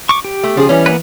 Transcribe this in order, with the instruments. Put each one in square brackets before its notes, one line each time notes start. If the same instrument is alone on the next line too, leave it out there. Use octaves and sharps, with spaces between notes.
[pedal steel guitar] C#6 D6
G4
[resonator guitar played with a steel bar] A3
[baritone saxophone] C#3 [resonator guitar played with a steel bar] F3 G#4
[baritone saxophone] E3 [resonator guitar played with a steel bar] G3 C#4
[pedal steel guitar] A#3 B3 B4